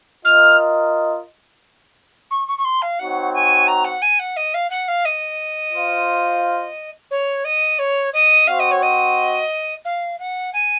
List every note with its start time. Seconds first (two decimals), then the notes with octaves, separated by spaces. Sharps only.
0.24 F4 A#4 D#5 F6
2.30 C#6
2.47 C#6
2.58 C#6
2.64 C6
2.82 F5
2.99 C4 D#4 F#4 C#5 F#5
3.34 G#5
3.67 A#5
3.84 F#5
4.01 G#5
4.19 F#5
4.36 D#5
4.54 F5
4.70 F#5
4.88 F5
5.05 D#5
5.72 F4 C5 F5
7.10 C#5
7.44 D#5
7.78 C#5
8.13 D#5
8.47 C4 F#4 C5 F5 F#5
8.59 D#5
8.71 C#5
8.82 D#5
9.84 F5
10.19 F#5
10.53 G#5